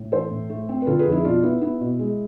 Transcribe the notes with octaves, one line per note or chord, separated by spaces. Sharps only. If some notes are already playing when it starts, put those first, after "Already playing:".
Already playing: A2
E3 A4 C5
A2
A3
C4
B4
D3 F4 A4
G#4 B4
F2
E4 G#4
B2 D4 F4
B3 E4
B3 E4
B2
G#3